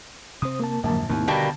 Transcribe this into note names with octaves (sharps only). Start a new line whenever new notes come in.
C3 C4 C5 D#6
A#3 A#4 A5
A#1 F2 G#2 D3 F#3 A#3 A5
D#2 G#2 B2 A3 A#3 C4 E4
B2 D3 G3 A#3 B3 A5